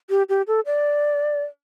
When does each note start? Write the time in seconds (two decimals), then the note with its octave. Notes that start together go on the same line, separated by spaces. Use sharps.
0.10 G4
0.29 G4
0.47 A4
0.66 D5